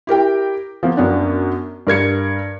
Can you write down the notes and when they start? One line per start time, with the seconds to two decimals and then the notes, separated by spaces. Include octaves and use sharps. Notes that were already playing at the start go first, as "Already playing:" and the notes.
0.07 E4 G4 A#4 G5
0.83 F3 A#3 B3
0.97 F#2 B3 C#4 D4
1.87 G2 A#4 G#6 C#7